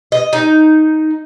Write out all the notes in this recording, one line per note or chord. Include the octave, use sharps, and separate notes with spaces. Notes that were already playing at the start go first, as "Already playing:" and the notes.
D#5
D#4